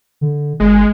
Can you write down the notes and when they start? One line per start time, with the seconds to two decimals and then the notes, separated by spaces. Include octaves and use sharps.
0.21 D3
0.60 G1 G#3